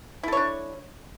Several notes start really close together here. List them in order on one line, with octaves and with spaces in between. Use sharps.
E4 A4 C#5 D4